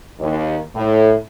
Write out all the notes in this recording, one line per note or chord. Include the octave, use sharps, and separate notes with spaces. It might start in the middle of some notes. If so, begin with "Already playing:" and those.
D#2
A2